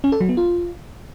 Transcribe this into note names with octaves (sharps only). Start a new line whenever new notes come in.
C#4
A4
F#3
B3
F4